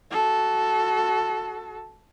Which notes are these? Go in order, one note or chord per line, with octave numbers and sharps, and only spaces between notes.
F#4 A4